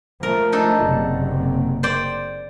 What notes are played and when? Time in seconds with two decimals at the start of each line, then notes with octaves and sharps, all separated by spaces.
0.23 F3 A3 A#4
0.52 D4 D#4 A4
0.84 F#1 C3
1.83 C5 D5 G5